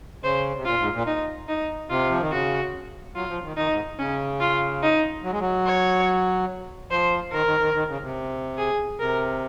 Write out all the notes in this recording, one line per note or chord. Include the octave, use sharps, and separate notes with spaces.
C#3 C5
C3
A#2 F4
G#2
A#2
D#4
D#4
C3 F4
F3
D#3
C#3 F#4
F#3 F4
F3
D#3
D#3 D#4
G#2
C#3 C#4
F4
D#4
F#3
G#3
F#3
C#5
F3 C5
D#3 A#4
D#3
D#3
D#3
C#3
C3
G#4
C3 A#4